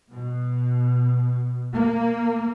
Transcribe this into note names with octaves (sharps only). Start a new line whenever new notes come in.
B2
A#3